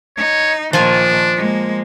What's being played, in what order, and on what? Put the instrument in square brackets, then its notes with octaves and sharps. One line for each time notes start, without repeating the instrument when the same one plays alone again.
[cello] D#4 [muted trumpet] C#5
[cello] A#2 D#3 [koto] F3 F4 G#5 [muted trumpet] D4
[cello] G#3 A#3